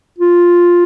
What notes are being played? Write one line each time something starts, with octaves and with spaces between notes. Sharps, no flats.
F4